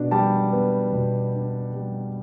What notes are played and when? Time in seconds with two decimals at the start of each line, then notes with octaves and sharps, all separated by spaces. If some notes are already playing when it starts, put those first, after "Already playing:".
Already playing: B2 D4
0.11 G3 G5 A5
0.52 B3
0.93 B2
1.34 D4
1.74 G3